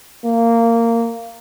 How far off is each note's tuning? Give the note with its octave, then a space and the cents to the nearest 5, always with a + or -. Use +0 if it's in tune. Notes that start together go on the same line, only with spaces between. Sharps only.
A#3 -15